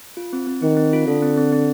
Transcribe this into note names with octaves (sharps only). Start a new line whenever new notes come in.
F4
C4
C4
D#3 C4
C4
F4
D3 A4
C4
C4
C4